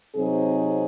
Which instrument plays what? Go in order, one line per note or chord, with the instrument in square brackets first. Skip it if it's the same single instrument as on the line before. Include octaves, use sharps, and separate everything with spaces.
[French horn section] C3 F#3 C4 D#4 G#4